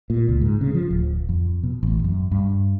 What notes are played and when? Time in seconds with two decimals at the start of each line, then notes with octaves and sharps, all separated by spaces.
0.10 A#2
0.29 C#2
0.41 G#2
0.61 C#3
0.75 F3
0.91 D1
1.29 F2
1.63 B2
1.83 A1
2.04 F#2
2.31 G2